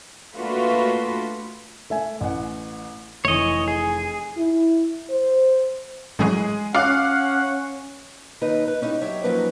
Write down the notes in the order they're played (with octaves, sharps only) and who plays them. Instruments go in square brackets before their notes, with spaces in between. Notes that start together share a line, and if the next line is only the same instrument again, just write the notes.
[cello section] A3 A#3 D4 F4 F#4 B4
[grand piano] A3 E5 G#5
A1 F#5
[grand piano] F1 E3 [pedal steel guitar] C#5 D#5
[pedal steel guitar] G#4
[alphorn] E4
C5
[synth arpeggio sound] A2 E3 F#3 [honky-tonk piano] G#3 G#4
[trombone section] C#4 [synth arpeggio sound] F4 [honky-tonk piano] F5 D6 F#6 [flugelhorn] F#5
[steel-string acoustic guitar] D#2 D#4 B4
B4
C#4 D#4 E4 F#4 G4
F#3 G4 C#5 E5
F3 F#3 A#3 C#4 D#4 B4